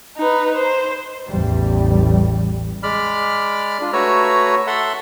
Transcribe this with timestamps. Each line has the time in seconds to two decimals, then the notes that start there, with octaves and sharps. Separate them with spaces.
0.17 D#4 B4
0.55 C5
1.27 A1 E2 G3
2.83 G#3 D5 B5 F6
3.81 D4 F4
3.93 A3 F#4 B4 C#5 A#5 E6
4.67 A4 E5 F#5 C6